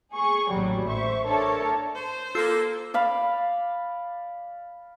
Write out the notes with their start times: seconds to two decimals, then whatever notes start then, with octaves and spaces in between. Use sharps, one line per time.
0.14 G#4 C#6
0.51 A1 D#2 F#3 G3
0.88 C5 E5 C#6
1.25 D4 A4 A#4 C#5 E5 A5
1.95 C5
2.35 A#3 F4 A4 E6 C7
2.94 D5 F5 B5